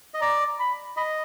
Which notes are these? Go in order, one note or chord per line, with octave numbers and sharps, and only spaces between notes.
D#5
D5 A#5
B5
D#5 B5